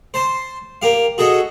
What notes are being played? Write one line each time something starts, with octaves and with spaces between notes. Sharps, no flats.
C5 A5 C6
A#3 G4 F5
F#4 G#4 A4 D#5